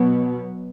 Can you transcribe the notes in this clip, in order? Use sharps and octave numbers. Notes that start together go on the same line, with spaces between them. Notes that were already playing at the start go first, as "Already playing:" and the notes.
Already playing: B2 F#3 B3